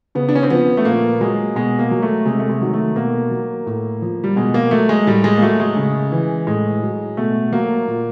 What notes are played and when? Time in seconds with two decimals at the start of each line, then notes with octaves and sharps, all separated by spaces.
0.15 C#3 B3
0.29 D4
0.35 C#4
0.43 C4
0.50 F3 B3
0.77 A3
0.85 A#2 A#3
1.20 F#3 G#3
1.55 B2 G#3
1.79 A#3
1.91 F#3
2.02 A3
2.26 C3 G#3
2.39 A3
2.50 G#3
2.61 D#3 F#3
2.73 A3
2.96 B2 A#3
3.31 F#3
3.66 A2
4.02 F3
4.24 G3
4.36 B2 G#3
4.54 A#3
4.71 F#3 A3
4.89 G#3
5.07 A2 G3
5.24 G#3
5.37 A#3
5.42 F#3 A3
5.60 G#3
5.77 C#3
6.12 E3
6.47 A2 G#3
6.83 F#3
7.17 B2 A3
7.52 F#3 A#3
7.88 A#2